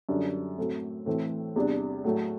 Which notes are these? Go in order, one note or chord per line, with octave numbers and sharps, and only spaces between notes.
F#2 D3 G3 D4
A2 F#3 A3 C4
A2 E3 A3 C4
E2 C3 G3 D4
A2 F#3 A3